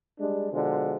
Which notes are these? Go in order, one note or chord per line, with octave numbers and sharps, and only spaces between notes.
G3 G#3 D4
B2 D3 F3 G#3